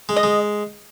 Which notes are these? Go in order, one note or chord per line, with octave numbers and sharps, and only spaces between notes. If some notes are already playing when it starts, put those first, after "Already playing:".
G#3
D#5
G#3